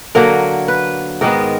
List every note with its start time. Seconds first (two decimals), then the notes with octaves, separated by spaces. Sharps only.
0.15 D3 F#3 A#3 A#4
0.68 B4
1.21 G#2 D#3 G#3 B3 A#4